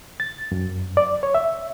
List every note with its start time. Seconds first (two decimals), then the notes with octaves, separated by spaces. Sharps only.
0.20 A6
0.52 F#2
0.97 D5
1.23 C#5
1.35 E5